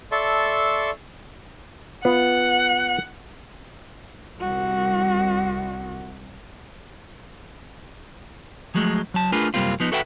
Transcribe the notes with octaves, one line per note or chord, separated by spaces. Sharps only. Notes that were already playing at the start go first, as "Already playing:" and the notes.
A4 D5 E5 A5 C6 C#6
B3 F4 F#5
C2 F#4
F3 F#3 G#3 A3
F#3 A5
A3 D4 F4 G#4 A#4 B4
F#2 C3 G3 A#3 C4 F4
F3 B3 D#4
F#4 A4 B4 E5 F#5 G5